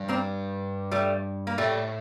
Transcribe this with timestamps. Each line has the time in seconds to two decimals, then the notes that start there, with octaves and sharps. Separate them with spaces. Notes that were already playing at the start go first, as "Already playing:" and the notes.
Already playing: G2
0.08 A#3 C4
0.91 G3 A3
1.47 A#3
1.58 A2 G3 A3